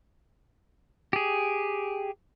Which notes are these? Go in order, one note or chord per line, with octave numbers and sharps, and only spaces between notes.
G4 G#4